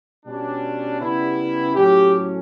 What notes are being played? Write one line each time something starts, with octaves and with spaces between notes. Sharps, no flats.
B2 G3 C#4 D4
C#3 G3 B3 E4
A2 F#3 A3 C#4 G4